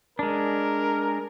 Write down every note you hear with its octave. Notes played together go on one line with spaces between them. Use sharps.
G#3 D4 A#4